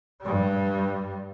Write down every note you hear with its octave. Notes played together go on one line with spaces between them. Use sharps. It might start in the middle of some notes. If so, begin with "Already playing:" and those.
G2 G3